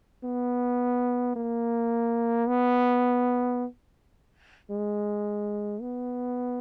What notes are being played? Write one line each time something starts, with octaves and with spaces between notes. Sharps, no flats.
B3
A#3
B3
G#3
B3